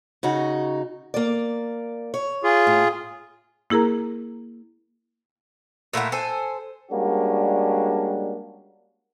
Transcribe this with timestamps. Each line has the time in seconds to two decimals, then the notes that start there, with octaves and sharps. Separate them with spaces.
0.23 C#3 D#4 F#4
1.14 A#3 D5
2.14 C#5
2.43 F4 G#4
2.67 A2
3.70 A#3 E4 G#4 A#4 A#5
5.93 A#2 A3 E4 F#5
6.12 A4 C5 G#5
6.91 G3 G#3 A#3 C#4 D4 F#4